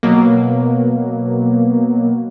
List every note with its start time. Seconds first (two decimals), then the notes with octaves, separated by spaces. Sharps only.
0.03 B2 F#3 A#3